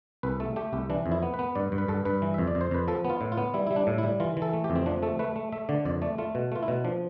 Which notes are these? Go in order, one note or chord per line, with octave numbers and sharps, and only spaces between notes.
C2 B4
A3 A4
A3 G4
C2 G4
E3 D4
F2
E4
B3
B4
B3
G2 D5
G2
B4
G2 A4
G2 B4
E3
F2 E5
D5
F2
C5
F2 B4
F3 A4
B3
F4
A2
F4
B3
G3 E4
G3 E4
D4
A2
E4
G3
E3 F4
E3
A4
A3
G4
F2
C4
F3 D4
A3 A4
A3 B4
A3
A3 E5
D3 D5
F2 D5
A3 D5
A3 F4
B2
A3 F4
E4
B2
F3 D4